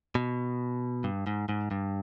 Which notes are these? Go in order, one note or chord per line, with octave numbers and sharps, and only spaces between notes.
B2
G2
G#2
G#2
G2